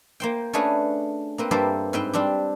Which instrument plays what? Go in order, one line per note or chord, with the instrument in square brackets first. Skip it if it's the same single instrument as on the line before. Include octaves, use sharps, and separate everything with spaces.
[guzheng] A#3 C5 G5
A3 C#4 D4 F#4 G#4 B4
A#3 C4 B4
G2 A#3 G4 A4 C5 E5
G#2 C4 B4 C5 G5
G3 C4 D4 G4